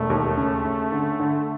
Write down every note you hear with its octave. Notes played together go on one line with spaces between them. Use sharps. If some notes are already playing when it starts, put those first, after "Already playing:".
Already playing: E1 A3
D#2
C#3
C#3
D3
D3